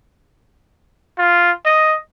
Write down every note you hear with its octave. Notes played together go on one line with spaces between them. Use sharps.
F4
D#5